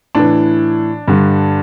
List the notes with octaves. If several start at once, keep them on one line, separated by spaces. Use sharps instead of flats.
A2 E3 D4
G2 D3